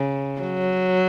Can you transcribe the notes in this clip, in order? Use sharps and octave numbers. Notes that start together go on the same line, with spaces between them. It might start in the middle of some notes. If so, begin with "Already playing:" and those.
Already playing: C#3
F#3